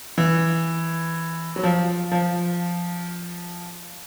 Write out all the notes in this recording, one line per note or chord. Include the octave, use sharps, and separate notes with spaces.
E3
F#3
F3
F3